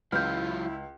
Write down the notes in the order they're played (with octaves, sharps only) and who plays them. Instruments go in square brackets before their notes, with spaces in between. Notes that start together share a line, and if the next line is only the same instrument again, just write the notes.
[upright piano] C#2 [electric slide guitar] F#3 F4 [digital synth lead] E4 [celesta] F6 G6